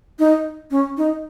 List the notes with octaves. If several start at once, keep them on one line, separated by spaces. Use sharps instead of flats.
D#4
C#4
D#4